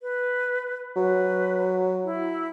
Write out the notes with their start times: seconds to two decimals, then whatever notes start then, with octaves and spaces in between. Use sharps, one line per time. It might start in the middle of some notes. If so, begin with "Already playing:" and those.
0.02 B4
0.96 F#3 B4
2.04 E4